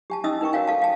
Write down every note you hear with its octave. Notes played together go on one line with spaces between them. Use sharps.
G4 G#5 A5
C#4 D#4 D#5 D#6 E6
D#4 A#4 G5 C#6
F#4 A#4 C#5 F5 G#5
A4 F5 A5
F5 G5 A5